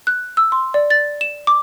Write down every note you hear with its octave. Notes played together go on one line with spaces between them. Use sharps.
F#6
E6
C6
D5
A6
E7
D6